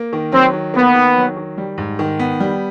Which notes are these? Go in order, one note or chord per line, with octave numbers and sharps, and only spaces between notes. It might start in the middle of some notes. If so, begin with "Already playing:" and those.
Already playing: A#3
D#3
F#3 C4
D#3
A#3 B3
D#3
F#3
D#3
G3
G#2
D#3
B3
G3